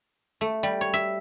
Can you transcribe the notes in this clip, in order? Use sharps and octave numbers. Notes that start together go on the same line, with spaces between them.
A3
G3
C#5
E5